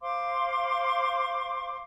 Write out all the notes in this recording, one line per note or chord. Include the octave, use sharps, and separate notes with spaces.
C5 F5 C6 D6